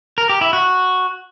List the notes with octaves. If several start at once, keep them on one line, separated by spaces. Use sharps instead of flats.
A#4
G4
E4
F#4